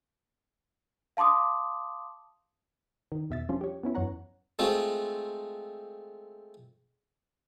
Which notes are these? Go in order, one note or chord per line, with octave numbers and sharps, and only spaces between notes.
F5 A5 C6 D6 D#6
D#3
E2 B2 E5 E6 A6
F3 G3 C#4 D4 F4
G4 C#5
B3 C#4 E4
F#2 E3 C#5 F#5 A#5
G#3 A3 C4 F4